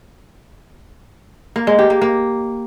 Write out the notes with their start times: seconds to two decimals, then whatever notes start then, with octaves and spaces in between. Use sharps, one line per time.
1.56 A#3
1.67 G#3
1.79 G4
1.90 A#3
2.02 A#3